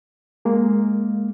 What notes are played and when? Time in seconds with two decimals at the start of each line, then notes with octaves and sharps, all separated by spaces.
0.45 G#3 A#3